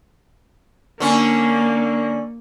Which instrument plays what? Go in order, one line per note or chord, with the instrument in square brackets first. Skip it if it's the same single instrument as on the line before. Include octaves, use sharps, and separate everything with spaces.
[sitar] D3 C#4 [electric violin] A#3